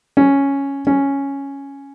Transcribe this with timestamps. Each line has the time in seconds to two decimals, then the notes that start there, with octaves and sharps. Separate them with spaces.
0.17 C#4
0.87 C#4